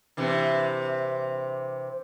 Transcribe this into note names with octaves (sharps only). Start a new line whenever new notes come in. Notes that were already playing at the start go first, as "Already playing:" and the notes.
C3 E3 D4